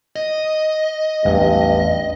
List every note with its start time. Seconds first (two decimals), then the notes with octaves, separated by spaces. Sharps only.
0.16 D#5
1.25 A1 E2 G2 F#3